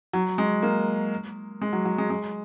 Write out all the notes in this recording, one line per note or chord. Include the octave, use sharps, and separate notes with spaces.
F#3
G#3
A#3
G#3
F#3
F#3
G#3
G#3